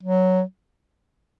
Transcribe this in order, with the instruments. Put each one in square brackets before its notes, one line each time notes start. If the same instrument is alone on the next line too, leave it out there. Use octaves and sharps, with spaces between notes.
[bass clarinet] F#3